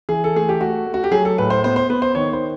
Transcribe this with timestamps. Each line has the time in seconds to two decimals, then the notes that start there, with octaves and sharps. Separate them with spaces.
0.09 E3 G#4
0.24 A4
0.35 A3 G#4
0.49 G4
0.60 A3 F#4
0.86 A3
0.94 F#4
1.04 G4
1.11 F#3 G#4
1.25 A4
1.38 A2 B4
1.50 C5
1.64 B3 C5
1.76 C5
1.90 B3 B4
2.02 C5
2.15 D#3 C#5
2.33 C5